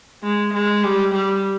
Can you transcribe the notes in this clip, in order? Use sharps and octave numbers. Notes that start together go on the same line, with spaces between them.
G#3
G#3
G3
G3